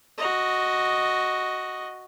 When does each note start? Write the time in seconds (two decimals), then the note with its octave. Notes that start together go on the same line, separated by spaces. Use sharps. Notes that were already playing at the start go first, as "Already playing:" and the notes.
0.18 F#4 D#5